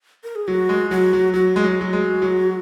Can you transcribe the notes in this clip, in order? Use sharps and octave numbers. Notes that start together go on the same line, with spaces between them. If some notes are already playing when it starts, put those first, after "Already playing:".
A#4
G#4
F#3 F#4
G#3
F#3 F#4
F#3
F#3 F#4
G#3
F#3
F#3
G#3
F#3